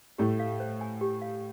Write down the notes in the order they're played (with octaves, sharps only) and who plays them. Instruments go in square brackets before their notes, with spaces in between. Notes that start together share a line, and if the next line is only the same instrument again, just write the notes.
[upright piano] A2 A3 [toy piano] G4
[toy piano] F5
C5
G#5
G4
F5